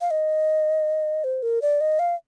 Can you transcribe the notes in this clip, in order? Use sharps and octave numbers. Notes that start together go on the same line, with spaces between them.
F5
D#5
C5
A#4
D5
D#5
F5